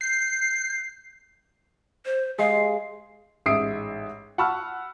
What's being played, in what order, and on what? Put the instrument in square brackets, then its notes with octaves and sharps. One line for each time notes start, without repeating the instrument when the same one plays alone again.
[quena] G6 [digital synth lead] C7
[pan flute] C5
[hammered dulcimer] G#3 [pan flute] F5
[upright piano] A1 G#2 E5 D#6 C7 D7
F#5 A5 B5 C#6 E6 F6